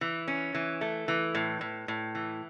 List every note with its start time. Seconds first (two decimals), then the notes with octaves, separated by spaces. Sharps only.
0.01 E3
0.28 C#4
0.55 E3
0.81 A3
1.08 E3
1.35 A2
1.61 A2
1.88 A2
2.15 E3